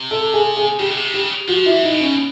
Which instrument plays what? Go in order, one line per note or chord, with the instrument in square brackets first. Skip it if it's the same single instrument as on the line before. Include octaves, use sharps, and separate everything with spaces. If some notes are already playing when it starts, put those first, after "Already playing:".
Already playing: [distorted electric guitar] C3
[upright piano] A4
G#4
G#4
[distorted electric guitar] C#3 [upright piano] G4
[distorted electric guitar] B2
C3
[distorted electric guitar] C#3 [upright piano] G4
[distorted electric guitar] F3 [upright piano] F#4
[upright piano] E4
[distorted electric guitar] E3
[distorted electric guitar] A#2 [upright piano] D#4
[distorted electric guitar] B2
[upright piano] C#4